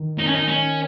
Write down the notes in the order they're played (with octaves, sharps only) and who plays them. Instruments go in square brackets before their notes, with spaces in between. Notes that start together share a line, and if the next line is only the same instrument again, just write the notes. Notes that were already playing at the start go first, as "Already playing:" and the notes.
Already playing: [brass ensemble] D#3
[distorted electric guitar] D#4
C#4
D#4
C#4